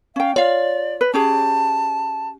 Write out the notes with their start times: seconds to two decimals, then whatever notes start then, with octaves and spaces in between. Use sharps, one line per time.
0.16 C#4 F5 G5
0.36 F4 C#5 D5 F5
1.01 B4
1.14 C#4 G4 G#4 A5